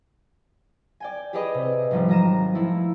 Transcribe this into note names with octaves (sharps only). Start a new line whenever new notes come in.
D5 G5 G#5
G4 G#4 B4 D5 D#5
C3
G#1 D#3 F3 G3
F#3 F4 A#5 D#7 E7
F3 A3 E4